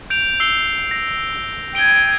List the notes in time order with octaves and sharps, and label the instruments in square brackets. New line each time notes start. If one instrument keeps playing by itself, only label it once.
[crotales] G6 D7 F7
E6 C7 G7
A#6
[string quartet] G5 D#6 G#6 [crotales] D7 G7